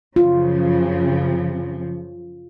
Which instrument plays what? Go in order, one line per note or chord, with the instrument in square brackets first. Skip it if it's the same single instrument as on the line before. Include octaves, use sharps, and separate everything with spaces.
[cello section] F#2 C#3 F3 [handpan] F4